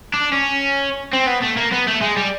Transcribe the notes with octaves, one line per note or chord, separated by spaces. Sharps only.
D4
C#4
C4
B3
A3
A#3
B3
A3
G#3
G3